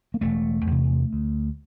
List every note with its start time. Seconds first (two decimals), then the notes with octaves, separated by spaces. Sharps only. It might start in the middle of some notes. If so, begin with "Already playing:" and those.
0.14 A#3
0.21 E1 A3
0.67 E2 C3
1.13 D2